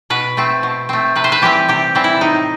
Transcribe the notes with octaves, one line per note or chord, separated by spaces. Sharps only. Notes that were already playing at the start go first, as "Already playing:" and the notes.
B2 B4
A3 C4
B2
A3 C4
C3 B4
C5
B4
E3 G3 C4 G4
C3 G4
E3 G3 C4
E4
A2 D#4